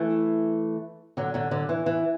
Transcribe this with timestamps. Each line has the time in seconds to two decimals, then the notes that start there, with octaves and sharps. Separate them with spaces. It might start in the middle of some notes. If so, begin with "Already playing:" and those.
Already playing: E3 A3
1.17 D3 F#3
1.34 D3 F#3
1.51 D3 F#3
1.69 E3
1.86 E3